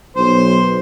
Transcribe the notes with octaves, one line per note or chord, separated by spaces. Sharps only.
B1 C5